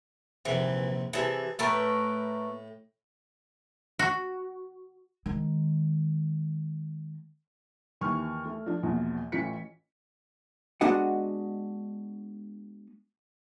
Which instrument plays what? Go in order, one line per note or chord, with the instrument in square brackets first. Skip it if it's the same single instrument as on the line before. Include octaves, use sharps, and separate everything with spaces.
[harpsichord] A#1 D#2 C3 [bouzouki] E3
[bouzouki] C3 E3 [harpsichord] G#4 A5
[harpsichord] A2 G5 [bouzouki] A3 A#4 B4
[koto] F#4
[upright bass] D#3 G#3
[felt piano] D#2 E3 C#6 F6
A3
F3 D4
A#1 E2 B2 F3
A1 E3 C#4 F4 B6 C#7
[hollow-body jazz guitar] G#3 B3 D4 F#4 D#5 F#5